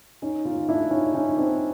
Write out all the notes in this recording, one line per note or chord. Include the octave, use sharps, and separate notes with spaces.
C#4 D#4
D#4 F4
D4 E4
C#4 D#4
C#4 D#4
C4 D4